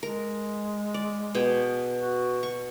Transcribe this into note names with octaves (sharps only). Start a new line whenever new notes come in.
G#3 A#4
D5
B2 G#4 G5
F#4
C#6